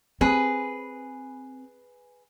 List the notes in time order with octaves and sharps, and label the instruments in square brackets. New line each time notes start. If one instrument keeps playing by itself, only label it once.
[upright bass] C4 [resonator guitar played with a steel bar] G#4 B4